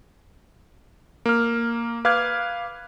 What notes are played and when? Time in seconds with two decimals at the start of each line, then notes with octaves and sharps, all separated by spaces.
1.26 A#3 F6
2.05 B4 F5 D6 F6 F#6 G#6